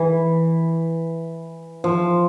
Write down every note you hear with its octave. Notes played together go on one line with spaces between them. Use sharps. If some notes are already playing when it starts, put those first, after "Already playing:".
Already playing: E3
F3